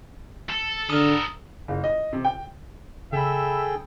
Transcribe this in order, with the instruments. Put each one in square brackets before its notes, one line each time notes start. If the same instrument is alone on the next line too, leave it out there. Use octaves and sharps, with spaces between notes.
[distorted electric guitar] A4
[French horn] D3 [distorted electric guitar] A4 A#4 [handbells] D#6
[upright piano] F#1
D#5
C3
G5
[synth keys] C#3 B5 [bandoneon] G#4 A4 G5 [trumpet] E5